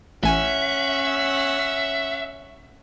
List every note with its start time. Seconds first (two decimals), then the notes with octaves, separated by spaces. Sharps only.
0.24 A1 C#4 E5 F#5 G#5